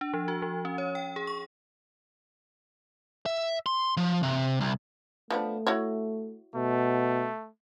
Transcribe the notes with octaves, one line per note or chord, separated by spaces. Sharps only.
D4
F3
F#4
F3
C#4
C#5
G5
G#4
C#6
E5
C6
F3
C3
C2
F3 A3 B3 D4
E4 F#4 C#5
B2 A3